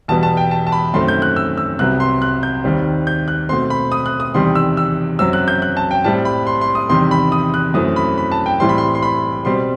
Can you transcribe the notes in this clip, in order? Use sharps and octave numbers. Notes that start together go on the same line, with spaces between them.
E2 B2 G3 B3 A5
A5
G5
A5
A5
B5
F#2 D#3 A3 C4 C6
G6
F#6
E6
E6
C2 C3 F#3 B3 F#6
C6
F#6
G6
D#2 D#3 G3 C4
G6
F#6
B2 A3 C4 C6
B5
D#6
F#6
D#6
E2 C3 D#3 G3 C6
E6
E6
F#2 F#3 C4 E6
F#6
G6
F#6
A5
G5
A2 G3 C4 A5
B5
C6
C6
D#6
E2 C3 D#3 G3 C6
B5
D#6
F#6
F#2 E3 A3 C4 D#6
B5
B5
A5
G5
A2 E3 G3 C4 C6
B5
C6
C6
B5
B2 G3 C4 C6